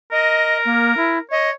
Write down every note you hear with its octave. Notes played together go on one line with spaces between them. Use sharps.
A#4 D#5
A#3
E4
C#5 D#5